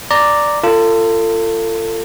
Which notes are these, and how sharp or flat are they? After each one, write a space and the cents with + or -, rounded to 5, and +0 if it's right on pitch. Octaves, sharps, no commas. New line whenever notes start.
D5 +0 A#5 -10
F4 -25 A4 +30